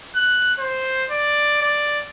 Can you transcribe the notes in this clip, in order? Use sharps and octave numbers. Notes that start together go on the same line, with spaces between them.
F#6
C5
D5
D5